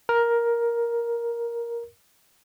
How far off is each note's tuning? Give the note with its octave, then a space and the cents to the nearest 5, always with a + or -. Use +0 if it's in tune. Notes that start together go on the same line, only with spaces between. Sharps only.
A#4 +10